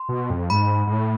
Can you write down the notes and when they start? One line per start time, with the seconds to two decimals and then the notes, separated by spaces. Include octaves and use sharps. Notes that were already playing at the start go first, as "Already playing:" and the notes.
Already playing: C6
0.09 B2
0.30 F2
0.50 G#2 B5
0.87 G#2
0.92 A2